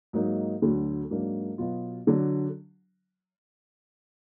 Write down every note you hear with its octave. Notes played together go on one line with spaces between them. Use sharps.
G#2 F#3 A#3 D#4
D2 D3 F#3 D4
G#2 F#3 A#3 D4
B2 F#3 B3 F4
D3 F#3 D4